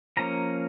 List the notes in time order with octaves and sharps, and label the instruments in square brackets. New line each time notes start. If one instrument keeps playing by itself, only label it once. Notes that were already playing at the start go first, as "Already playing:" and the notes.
[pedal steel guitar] F3 A#3 C#4 A#5